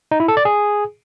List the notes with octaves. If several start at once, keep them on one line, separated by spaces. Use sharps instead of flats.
D#4
E4
A4
D5
G#4